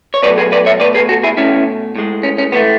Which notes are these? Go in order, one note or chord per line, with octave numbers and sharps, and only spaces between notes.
C#5
B2 F#3 A3 B4 D5
G#4 B4
B4 D5
C#5 E5
B2 A3 B4 D5
G#4 B4
F#4 A4
E4 G#4
B2 A3 C#4 E4
A2 G#3
C#4
C#4
A2 E3 A3 B3